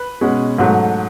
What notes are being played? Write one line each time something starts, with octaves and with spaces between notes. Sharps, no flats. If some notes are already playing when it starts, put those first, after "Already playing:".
Already playing: B4
B2 G#3 C#4
G#2 F#3 A3